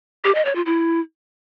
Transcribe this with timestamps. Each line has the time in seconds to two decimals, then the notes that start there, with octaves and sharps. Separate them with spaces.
0.24 G4
0.35 D#5
0.45 C#5
0.55 F4
0.66 E4